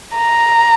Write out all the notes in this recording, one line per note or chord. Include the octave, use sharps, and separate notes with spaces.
A#5